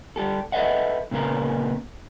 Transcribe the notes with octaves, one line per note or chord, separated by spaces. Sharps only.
G3 G4 A4
A4 B4 C#5 D#5 E5 F#5
A#2 C#3 A#3 B3 A#4